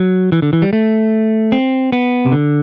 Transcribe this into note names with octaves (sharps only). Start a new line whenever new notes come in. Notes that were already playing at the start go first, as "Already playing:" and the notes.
Already playing: F#3
E3
D3
E3
G3
A3
C4
B3
C3
D3